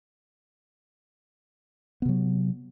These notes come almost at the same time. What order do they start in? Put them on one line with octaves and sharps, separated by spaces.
B3 C3 F#3